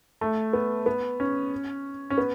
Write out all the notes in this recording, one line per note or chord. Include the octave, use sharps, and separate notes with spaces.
A3
B3
B3
C#4
C#4
B3